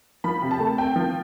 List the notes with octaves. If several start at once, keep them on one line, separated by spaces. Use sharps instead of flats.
F3 B5
C3
A5
A3
C4 G5
F3